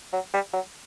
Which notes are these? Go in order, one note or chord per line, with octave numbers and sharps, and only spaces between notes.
F#3
G3
F#3